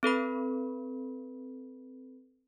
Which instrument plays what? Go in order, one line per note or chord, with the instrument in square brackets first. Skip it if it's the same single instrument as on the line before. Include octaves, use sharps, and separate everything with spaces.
[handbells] C4 A4 B4 B5